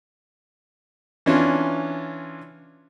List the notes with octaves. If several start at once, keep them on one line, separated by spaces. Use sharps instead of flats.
E3 C#4 D4 F4